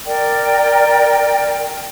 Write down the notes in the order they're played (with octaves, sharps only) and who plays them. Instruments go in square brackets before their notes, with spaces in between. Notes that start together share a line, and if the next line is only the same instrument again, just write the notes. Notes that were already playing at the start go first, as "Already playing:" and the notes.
[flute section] A#4 D5 G5